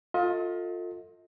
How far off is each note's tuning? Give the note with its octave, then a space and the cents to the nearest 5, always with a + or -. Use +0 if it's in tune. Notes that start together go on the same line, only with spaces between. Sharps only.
F4 +20 A4 +25 D#5 +40